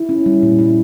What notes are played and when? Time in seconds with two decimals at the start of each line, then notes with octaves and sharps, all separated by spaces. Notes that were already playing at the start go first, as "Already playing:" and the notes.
Already playing: E4
0.09 C#4
0.26 G3
0.42 A#2
0.59 E4